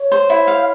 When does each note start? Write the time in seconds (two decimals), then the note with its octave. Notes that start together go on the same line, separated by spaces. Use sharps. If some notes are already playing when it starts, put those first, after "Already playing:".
Already playing: C#5
0.12 C5
0.30 E4
0.47 F5